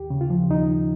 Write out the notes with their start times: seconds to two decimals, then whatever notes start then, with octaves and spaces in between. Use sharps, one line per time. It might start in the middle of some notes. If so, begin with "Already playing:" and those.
Already playing: D#2 G4
0.10 C#3
0.21 F4
0.30 F3
0.50 D#2 D#4